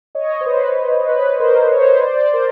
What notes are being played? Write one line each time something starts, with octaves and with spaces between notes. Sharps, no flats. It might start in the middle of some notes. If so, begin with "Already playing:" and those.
C#5 D#5
C5
B4
B4
A#4 C5
C#5
C5
B4 C#5
C5 D5
A#4 C5